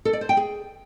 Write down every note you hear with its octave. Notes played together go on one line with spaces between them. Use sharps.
A4
D5
C5
G5
G#4